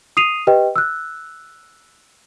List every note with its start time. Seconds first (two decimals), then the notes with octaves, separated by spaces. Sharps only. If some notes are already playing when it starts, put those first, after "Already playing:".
0.17 D#6 C7 D#7 F7
0.47 G4 B4 D#5 G5
0.76 E6 F#6